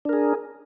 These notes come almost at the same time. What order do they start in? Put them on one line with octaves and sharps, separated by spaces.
D4 A#4 G#4